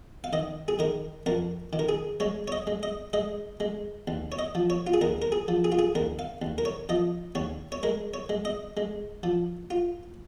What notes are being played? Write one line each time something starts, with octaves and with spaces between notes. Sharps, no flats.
F5
D#3 D#5
G#4
D#3 A#4
F2 A#4
D#3
A#4
G#4
G#3 C#5
C#5
D#5
G#3
D#5
G#3 D#5
G#3
D#2
C#5
D#5
F3
C#5
F4
G#4
D#2 A#4
A#4
G#4
F3
G#4
F4
G#4
D#2 A#4
F5
D#2
A#4
C#5
F3 D#5
D#2 C#5
C#5
G#3 A#4
C#5
G#3
D#5
G#3
F3
F4